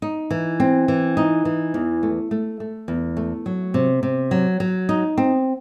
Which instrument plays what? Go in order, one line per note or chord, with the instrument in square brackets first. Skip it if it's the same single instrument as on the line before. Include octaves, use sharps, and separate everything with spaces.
[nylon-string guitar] D#4
E3
C4
E3
D#4
E3
E2
A3
A3
A3
E2
A3
F#3
C3
C3
F#3
F#3
D#4
C4